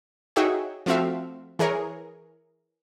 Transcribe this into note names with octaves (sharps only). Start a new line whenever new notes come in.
D#4 F#4 G#4 C#5 E5 G5
F3 A3 C4 F#4 E5 F5
E3 G#4 A#4 C#5